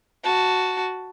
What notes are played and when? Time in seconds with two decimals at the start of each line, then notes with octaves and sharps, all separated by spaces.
0.23 F#4 A5